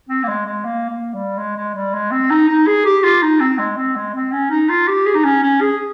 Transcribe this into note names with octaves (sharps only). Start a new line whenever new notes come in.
C4
A#3
G#3
G#3
A#3
A#3
G3
G#3
G#3
G3
G#3
C4
D#4
D#4
G#4
G4
F4
D#4
C4
G#3
C4
G#3
C4
C#4
D#4
F4
G4
G#4
D#4
C#4
C#4
G#4